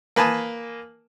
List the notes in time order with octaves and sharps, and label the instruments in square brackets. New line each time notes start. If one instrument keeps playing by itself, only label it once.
[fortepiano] A#3 B4 G#5 A5 D#6